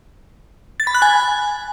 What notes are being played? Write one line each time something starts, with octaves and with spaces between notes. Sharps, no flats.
A6
B5
F#6
G#5